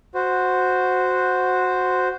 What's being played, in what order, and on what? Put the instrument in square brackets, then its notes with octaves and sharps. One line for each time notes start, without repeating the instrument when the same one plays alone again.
[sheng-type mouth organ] F#4 C5